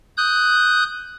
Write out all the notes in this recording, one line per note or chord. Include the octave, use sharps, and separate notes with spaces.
D#6 F#6 G6